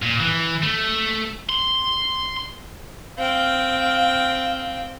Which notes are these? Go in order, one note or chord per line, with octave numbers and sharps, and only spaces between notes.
A#2
E3
A3
C6
C4 F5 G5